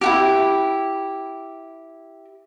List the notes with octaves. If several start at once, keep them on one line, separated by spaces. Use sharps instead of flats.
E4 F#4 G4